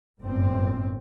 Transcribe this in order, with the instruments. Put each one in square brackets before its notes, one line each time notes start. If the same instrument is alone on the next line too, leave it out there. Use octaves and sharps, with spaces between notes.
[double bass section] G1 F#2 A2 C4